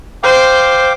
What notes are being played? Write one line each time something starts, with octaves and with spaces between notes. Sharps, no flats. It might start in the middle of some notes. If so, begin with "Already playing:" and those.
C5 F5 G5 D6